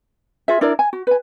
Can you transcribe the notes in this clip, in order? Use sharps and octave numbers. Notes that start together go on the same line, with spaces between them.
F4 G#4 E5
D4 E4 A#4 D5
G#5
F#4
B4 G#5